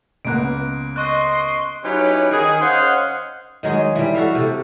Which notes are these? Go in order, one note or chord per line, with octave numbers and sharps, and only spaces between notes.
C#2 A#3 B3 F#6 D7
D#5 C6 C#6 F#6
F#3 C#4 D#4 E4 G4 B4
D#3 G#4
C#4 C5 D#5 F5 F#5
D#3 F#3 G#3 G#4
E3 G3
F#4 A4 E5 F5
C3 A4